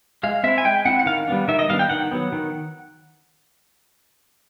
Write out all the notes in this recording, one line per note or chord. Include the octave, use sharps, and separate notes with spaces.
G#3 F5
C4 E4 E5
G#5
G#3 G5
C4 E4 F#5
F#5
D#3 F5
G3 B3 D4
D#3 E5
D#5
G3 B3 D4 F5
G5
D#3 F#5
F#3 B3
D#3